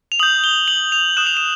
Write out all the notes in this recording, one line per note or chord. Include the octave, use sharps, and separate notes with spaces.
F7
D#6 G6 F#7
G7
F#7
F7
D#6 F#6 E7
F7
E7